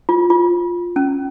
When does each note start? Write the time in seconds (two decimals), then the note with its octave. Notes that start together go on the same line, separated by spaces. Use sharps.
0.09 F4
0.30 F4
0.96 C#4